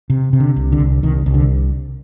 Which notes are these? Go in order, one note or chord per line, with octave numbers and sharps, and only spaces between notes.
C3
C3
D3
C2
D3
C2
C2 D#3
C2
D3